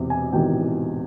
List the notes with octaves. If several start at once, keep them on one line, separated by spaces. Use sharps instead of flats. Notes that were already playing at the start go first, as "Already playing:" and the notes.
Already playing: E1 E2 C3
G#5
E1 E2 C3 D#3 G5